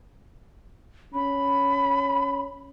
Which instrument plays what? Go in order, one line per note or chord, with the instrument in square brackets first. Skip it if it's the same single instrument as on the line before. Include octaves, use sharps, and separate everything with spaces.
[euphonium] C#4 [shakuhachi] B5